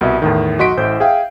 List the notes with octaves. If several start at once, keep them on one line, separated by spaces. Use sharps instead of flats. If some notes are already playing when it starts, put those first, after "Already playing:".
C2 B2 D#5 E5
E2 A2 D#3
B1 F#4 D#5 C6 B6 D7
A1 A2 C5 G6
G#4 E5 F5 G5